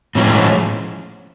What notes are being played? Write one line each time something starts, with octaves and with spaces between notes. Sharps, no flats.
A2 F3 G#3 C#4